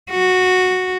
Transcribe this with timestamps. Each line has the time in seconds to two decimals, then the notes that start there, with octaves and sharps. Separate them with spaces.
0.10 F#4